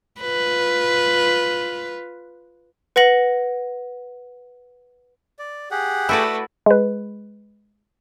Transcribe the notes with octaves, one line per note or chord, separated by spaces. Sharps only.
F4 B4
B4 F#5 A#6 F#7
D5
G4 G#4 F#5
A3 E4 F#4 B4 D5
G#3 B4